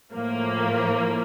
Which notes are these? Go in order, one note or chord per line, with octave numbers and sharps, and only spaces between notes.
A2 F3 A#3